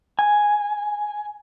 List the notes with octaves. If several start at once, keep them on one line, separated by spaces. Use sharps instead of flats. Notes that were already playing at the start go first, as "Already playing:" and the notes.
G#5